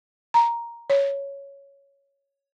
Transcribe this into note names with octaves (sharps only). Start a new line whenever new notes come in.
A#5
C#5